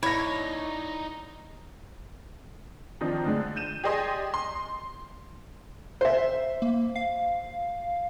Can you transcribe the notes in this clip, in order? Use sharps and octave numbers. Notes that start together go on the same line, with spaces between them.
D#4 E4 C#5 D5 B5 A#6
D#3 F3 C4 D4 D#4
D3 G#3 D5
G6 D#7 E7
G4 G#4 D5 D#5 G#5 C6
C6
C5 E5
A#3
F5